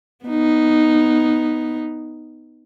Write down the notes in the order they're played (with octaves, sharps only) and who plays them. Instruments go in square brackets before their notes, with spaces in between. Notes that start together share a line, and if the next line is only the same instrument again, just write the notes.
[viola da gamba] B3 D#4